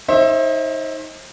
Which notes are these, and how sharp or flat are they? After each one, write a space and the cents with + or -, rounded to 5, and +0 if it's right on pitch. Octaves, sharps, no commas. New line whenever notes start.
D#4 +25 C5 +35 E5 +0